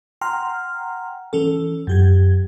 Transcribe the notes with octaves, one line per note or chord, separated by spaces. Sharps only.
F#5 G5 A#5 C6 F6
E3 C#4 A4
F#2 G4 G#6